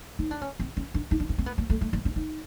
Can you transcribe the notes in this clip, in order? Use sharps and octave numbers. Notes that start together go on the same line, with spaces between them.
D#4
D4
C#4
C4
C#4
D4
D#4
D4
C#4
C4
B3
A#3
A3
A3
A#3
C#4
D#4